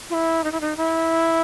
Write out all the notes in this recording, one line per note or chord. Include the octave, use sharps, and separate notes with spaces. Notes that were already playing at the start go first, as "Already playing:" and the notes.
F4
E4
D#4
E4
D#4
E4